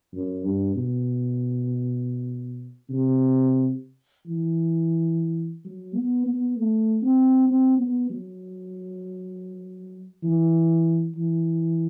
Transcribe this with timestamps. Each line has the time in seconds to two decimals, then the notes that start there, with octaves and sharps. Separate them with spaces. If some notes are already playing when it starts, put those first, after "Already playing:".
0.13 F#2
0.44 G2
0.75 B2
2.89 C3
4.26 E3
5.65 F#3
5.95 B3
6.26 B3
6.56 A3
7.02 C4
7.48 C4
7.79 B3
8.10 F#3
10.23 E3
11.16 E3